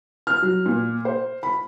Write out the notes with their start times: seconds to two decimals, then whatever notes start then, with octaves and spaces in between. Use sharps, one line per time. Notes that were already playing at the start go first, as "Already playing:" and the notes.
0.27 F6
0.42 F#3
0.66 A#2
1.05 C5
1.43 B5